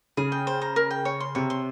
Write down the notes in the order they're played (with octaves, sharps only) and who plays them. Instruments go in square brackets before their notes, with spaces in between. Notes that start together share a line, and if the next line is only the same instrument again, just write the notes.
[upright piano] C#3 [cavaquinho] G#4
[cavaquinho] G5
C5
A#5
A#4
G5
C#5
C6
[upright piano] C3 [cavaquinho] C#5
[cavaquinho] C6